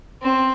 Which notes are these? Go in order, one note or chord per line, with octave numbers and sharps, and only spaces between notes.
C4